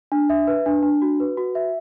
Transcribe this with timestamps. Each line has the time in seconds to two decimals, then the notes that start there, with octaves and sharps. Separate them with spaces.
0.12 D4
0.30 E5
0.47 B4
0.66 D4
0.83 D4
1.02 F#4
1.20 B4
1.38 F#4
1.55 E5